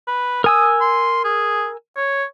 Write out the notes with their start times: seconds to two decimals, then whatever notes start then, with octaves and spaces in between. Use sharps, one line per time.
0.08 B4
0.44 A#4 G#5 D#6 E6
0.81 C6
1.25 G#4
1.96 C#5